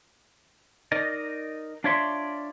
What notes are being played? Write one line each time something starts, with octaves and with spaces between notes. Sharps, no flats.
D#4 A#4 D5 D#5
D4 F4 C#5 D5 E5 C6